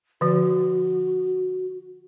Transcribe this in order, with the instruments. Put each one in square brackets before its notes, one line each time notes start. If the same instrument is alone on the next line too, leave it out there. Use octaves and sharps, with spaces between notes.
[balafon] D3 F3 [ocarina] F#4